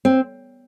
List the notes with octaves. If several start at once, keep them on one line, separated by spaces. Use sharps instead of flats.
C4